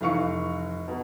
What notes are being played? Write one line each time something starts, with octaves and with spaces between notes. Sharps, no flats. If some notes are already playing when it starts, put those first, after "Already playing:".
F1 E3 F5 C#6 C#7
B2